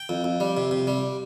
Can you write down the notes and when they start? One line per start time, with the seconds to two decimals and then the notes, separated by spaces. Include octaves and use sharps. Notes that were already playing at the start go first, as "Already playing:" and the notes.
Already playing: G5
0.09 F2
0.24 F2
0.40 G3
0.57 C3
0.71 C3
0.87 G3